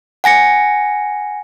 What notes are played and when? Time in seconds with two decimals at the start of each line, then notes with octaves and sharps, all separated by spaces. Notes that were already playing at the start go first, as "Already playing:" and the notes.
0.24 F#5 G#5 A#6 C#7